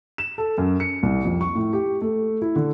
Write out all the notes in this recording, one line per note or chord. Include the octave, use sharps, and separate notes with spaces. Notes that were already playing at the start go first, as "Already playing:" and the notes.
E7
A4
F#2
C#7
C2
F2
C#6
A2
G4
A3
E4
D3